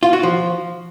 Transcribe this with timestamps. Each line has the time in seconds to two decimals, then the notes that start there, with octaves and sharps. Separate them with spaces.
0.03 F4
0.13 F#4
0.23 F3